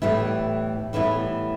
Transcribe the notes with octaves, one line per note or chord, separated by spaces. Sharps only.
A2 E3 G3 B3 E4
A2 E3 G3 B3 E4